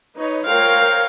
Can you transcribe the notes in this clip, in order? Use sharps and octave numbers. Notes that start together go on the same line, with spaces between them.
D#4 B4 C#5
F4 A#4 C5 C#5 F5 G5